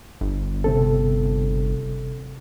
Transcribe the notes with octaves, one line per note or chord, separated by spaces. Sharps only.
G1
C3 C4 A4